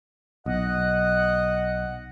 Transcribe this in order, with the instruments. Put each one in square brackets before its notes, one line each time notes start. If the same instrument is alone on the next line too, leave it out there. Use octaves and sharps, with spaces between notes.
[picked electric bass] B1 [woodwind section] D#5 F#5